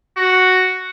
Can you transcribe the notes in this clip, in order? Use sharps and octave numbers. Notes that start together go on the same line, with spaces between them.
F#4